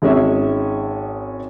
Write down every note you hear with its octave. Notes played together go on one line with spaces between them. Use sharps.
G#1 G#3 C#4 E5